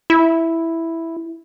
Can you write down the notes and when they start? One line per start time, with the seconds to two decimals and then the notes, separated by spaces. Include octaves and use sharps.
0.10 E4